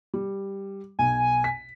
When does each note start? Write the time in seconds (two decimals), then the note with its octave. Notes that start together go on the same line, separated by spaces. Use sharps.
0.14 G3
0.99 B1 G#5
1.44 B6